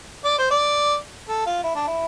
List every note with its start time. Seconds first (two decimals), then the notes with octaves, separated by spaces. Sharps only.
0.24 D5
0.38 C5
0.51 D5
1.28 A4
1.46 F4
1.63 E4
1.75 D4
1.87 E4